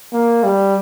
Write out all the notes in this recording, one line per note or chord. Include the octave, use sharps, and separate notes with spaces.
A#3
G3